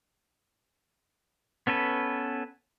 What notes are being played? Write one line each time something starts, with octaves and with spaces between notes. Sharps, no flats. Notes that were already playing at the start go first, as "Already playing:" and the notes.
B3 C#4 A4 B4